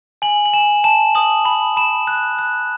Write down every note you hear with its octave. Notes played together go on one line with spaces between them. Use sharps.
G#5 F#7
F#7
G#5 E7
A5 E7
D#6 F#7
B5 F#7
B5 E7
F#6
F#6